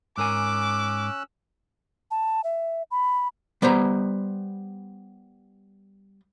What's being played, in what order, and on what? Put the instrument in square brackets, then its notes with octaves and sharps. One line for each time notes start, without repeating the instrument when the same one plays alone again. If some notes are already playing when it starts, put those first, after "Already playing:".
[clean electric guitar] G#2 A#4 G#5 [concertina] C#4 E6 F#6 [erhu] D6
[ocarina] A5
E5
B5
[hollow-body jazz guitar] G3 B3 C5 A#5